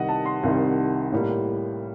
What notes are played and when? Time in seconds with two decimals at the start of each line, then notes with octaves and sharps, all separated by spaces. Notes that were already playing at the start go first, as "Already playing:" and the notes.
Already playing: C2 C3 D#3 G3 D#5 F#5
0.09 A5
0.25 C6
0.43 C2 C3 D#3 G3
1.12 A2 G3 A#3